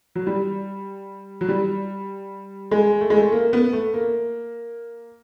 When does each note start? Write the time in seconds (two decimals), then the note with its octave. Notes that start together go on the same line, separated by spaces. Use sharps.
0.15 F#3
0.27 G3
1.41 F#3
1.48 G3
2.71 G#3
3.01 A3
3.10 G#3
3.17 A3
3.32 A#3
3.53 B3
3.73 A3
3.94 A#3